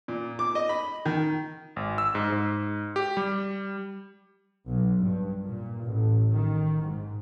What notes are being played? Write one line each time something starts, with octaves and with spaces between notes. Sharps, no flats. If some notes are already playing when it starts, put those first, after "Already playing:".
A#2
D6
D#5
B5
D#3
G#1
E6
G#2
G#2
G4
G3
B1
G2
A#2
A1
D#3
G#2